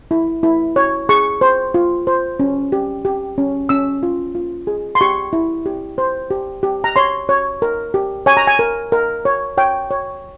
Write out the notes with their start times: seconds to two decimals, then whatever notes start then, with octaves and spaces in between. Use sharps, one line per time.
0.11 E4
0.43 E4
0.76 C#5
1.09 G#4 C#6
1.41 C5
1.74 F4
2.07 C5
2.40 C#4
2.72 G4
3.05 G4
3.38 C#4
3.69 C#4 E6
4.03 F4
4.35 F4
4.67 G#4
4.95 C6
5.01 G4 C#6
5.33 E4
5.66 G4
5.98 C5
6.30 G4
6.63 G4
6.84 A#5
6.96 C#5 C6
7.29 C#5
7.62 A#4
7.94 G4
8.26 C#5 G#5
8.37 A#5
8.47 G#5
8.59 A#4
8.92 A#4
9.25 C#5
9.58 C#5 G5
9.91 C#5